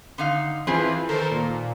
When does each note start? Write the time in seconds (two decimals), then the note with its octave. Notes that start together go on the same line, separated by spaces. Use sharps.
0.18 D3 D#4 F5
0.67 E3 F3 C4 G#4 B4
1.09 D#3 A4 A#4 C5
1.31 A#2